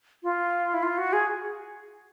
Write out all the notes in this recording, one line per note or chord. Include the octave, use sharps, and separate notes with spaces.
F4
E4
F4
F#4
G#4